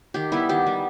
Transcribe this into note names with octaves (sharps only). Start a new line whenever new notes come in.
D#3 G4
G3 B3 E4
D#3 G4
G3 B3